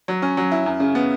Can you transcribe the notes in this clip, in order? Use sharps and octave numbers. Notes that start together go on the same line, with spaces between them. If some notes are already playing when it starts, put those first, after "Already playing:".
F#3
C#4
F#3
E4
F#2
C#3
B3